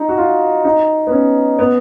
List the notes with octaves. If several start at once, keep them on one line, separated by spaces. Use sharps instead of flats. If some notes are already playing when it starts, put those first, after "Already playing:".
Already playing: D#4
F#4
F4
D#4
B3
C#4
B3